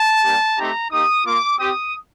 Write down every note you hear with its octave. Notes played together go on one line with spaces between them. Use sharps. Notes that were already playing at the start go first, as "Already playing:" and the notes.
Already playing: A5
G3 A#3 D4 G4
A3 C4 D#4 G4 A#5
A#3 D#4 G4 D#6
A#3 F4 D6
C4 G4 D#6